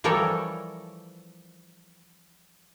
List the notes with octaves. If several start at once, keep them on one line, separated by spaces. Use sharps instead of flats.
E3 F3 G3 A4 A#4 C#5